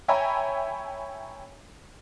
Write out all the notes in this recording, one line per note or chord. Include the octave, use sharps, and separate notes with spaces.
C#5 E5 G5 G#5 A#5 B5